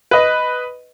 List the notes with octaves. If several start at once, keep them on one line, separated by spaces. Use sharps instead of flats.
B4 D#5